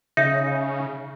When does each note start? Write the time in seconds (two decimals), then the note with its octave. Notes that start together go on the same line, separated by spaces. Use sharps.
0.17 C#3 D#4 E5